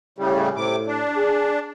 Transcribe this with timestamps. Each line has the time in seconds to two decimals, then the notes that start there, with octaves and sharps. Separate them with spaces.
0.18 A2 C#3 G3 G4
0.56 A2 C3 D6
0.87 D4
1.16 G#4